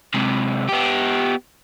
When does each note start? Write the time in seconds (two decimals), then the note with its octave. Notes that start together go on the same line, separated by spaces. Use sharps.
0.14 C3 G#3
0.69 B3 G4